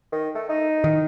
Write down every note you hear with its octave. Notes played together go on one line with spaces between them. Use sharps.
D#3
A3
D#4
D#3